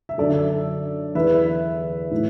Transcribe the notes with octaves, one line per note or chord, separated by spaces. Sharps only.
E5
F#2 D3 F#3 A4 D5
E2 E3 B4 E5
A2 F#3